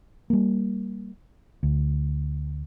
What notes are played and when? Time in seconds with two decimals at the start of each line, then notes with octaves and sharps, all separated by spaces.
0.30 G3 A#3
1.63 D2